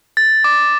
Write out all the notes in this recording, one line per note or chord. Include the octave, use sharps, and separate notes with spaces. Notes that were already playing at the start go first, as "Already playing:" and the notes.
A6
D6